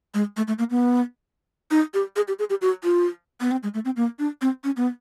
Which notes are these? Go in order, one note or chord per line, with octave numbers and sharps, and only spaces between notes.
G#3
A3
A3
A#3
B3
D#4
G4
G#4
G4
G#4
G4
F#4
F4
B3
C4
G#3
A3
C4
A#3
D4
C4
C#4
B3